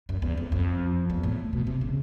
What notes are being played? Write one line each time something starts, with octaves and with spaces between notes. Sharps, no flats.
F#2
E2
F2
F2
E2
A2
B2
C3
C#3